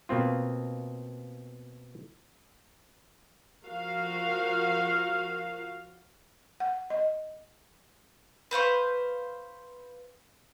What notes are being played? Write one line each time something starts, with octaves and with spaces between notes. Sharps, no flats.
B2 A#3 C4 F4
F3 F#4 A#4 F5
F#5
D#5
B4 C5 F5 C#6